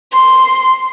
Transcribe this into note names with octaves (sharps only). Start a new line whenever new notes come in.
C6